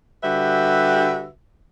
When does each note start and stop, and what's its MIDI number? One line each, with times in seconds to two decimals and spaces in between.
0.23 1.27 50
0.23 1.27 55
0.23 1.27 66
0.23 1.27 67
0.23 1.27 71
0.23 1.27 76